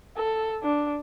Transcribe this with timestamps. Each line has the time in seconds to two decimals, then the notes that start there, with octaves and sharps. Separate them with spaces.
0.17 A4
0.63 D4